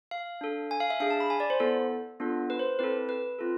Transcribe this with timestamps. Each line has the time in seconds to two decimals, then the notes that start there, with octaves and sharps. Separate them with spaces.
0.11 F5
0.41 D4 A4
0.71 G#5
0.80 F5
0.90 E5
1.00 D4 G#4 F5
1.10 A5
1.20 B5
1.30 G#5
1.40 D5
1.50 C5
1.60 B3 E4 A4
2.20 B3 D4 F4 A4
2.50 B4
2.59 C5
2.79 C4 E4 A4 B4
3.09 B4
3.39 C4 F4 A4